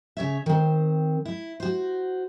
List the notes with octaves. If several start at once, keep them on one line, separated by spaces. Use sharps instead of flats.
C#3 C#5 E5
D#3 C4
E4
F#4 C5